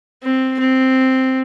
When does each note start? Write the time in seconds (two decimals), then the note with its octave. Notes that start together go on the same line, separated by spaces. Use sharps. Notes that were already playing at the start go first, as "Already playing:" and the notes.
0.23 C4
0.60 C4